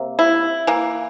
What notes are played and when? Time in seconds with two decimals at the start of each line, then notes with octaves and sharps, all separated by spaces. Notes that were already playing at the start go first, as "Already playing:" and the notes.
Already playing: C3 A#3
0.19 E4
0.67 E3 A#3